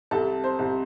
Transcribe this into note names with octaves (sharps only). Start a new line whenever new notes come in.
C2 A4 A5
C5
C2